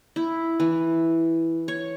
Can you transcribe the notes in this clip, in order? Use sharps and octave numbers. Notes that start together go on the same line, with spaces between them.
E4
E3
C#5